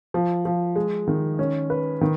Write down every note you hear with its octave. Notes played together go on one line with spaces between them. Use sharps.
F3
F3
G#3
D#3
C#4
B4
D#3